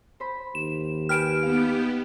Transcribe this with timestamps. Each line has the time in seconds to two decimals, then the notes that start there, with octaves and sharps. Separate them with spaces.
0.20 C5 B5
0.55 D#2 E7
1.09 G4 B4 G#5 F6 D7 E7
1.43 B3 D#4 G4 F5